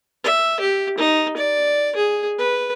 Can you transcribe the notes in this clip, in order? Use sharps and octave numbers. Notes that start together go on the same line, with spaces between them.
E5
G4
D#4
D5
G#4
B4